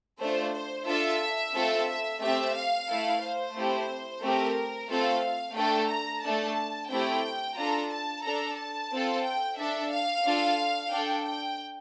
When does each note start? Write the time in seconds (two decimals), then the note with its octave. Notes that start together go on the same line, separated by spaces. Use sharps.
0.20 A3 D4 F4 C5
0.54 C5
0.87 D4 F4 A4 E5
1.54 A3 C4 F4 A4
1.88 E5
2.21 A3 C4 G4 E5
2.55 F5
2.89 A3 E4 A4
3.22 C5
3.56 A3 C4 E4 G4
4.22 A3 C4 G4 A#4
4.89 A3 C4 F4 A4 F5
5.56 A3 D4 A4 G5
5.90 A#5
6.24 A3 D4 A4 A5
6.91 A3 C4 E4 G4 G5
7.58 D4 F4 A4 A#5
7.92 A5
8.25 D4 A4 A#5
8.58 A5
8.92 C4 F4 A4
9.25 G5
9.58 D4 A4 E5
9.92 F5
10.26 D4 F4 A4
10.93 D4 A4 G5
11.27 G5